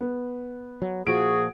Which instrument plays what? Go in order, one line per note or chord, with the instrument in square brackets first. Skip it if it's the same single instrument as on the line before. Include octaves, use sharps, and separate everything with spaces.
[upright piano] B3
[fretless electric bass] F#3
[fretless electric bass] A#2 F3 [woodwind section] F#4 G#4 [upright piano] D7